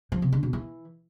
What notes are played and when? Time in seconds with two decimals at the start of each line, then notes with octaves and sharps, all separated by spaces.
0.12 F3
0.22 C3
0.32 D3
0.43 B2
0.53 E3